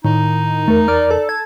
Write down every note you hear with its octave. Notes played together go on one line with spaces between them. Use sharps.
A2 D#3 D#4
E2 A3 A#4
D5 F6
A4 D5
G#6